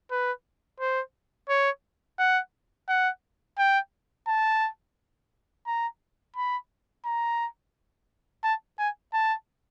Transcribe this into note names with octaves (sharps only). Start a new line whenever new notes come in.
B4
C5
C#5
F#5
F#5
G5
A5
A#5
B5
A#5
A5
G#5
A5